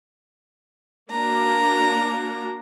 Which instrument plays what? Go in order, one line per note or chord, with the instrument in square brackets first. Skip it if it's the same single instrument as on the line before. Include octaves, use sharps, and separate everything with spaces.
[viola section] A#3 D4 F#4 [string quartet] A#5